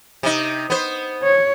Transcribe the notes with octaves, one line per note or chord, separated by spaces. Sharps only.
C3 D#4
B3 C5
C#5